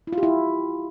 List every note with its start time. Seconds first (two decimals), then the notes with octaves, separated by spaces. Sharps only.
0.07 E4
0.13 F4
0.18 G4
0.23 E4